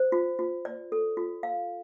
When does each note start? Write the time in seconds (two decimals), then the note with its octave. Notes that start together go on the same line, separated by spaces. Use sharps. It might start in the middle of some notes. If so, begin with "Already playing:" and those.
Already playing: C5
0.12 F4
0.39 F4
0.65 D5
0.92 A4
1.17 F4
1.43 F5